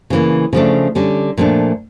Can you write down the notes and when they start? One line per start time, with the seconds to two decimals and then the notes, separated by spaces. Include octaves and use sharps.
0.10 C#3 E3 A#3
0.53 C#3 F3 A3 D4
0.95 D3 G3 C#4
1.37 A#2 F3 A3 D4